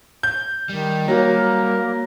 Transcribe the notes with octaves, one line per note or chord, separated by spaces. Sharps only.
G6
D#3 G3
F#3 A#3 A#4